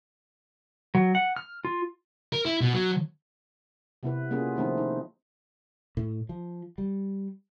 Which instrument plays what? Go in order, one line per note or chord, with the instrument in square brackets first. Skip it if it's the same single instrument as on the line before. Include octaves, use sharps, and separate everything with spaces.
[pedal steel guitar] F#3
F#5
F6
F4
[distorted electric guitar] A#4
E4
B2
F#3
[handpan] C3 B3 E4 B4
A#3 B3 C#4 F4 G#4
D#3 F3 A3 C4 D#4
D#4
[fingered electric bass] A2
F3
G3